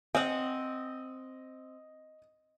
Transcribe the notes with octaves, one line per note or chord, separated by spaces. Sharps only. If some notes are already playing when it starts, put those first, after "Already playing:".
C4 D#5 F#5 D#6